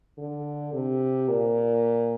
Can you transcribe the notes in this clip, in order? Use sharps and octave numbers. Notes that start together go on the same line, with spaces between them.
D3
C3
A#2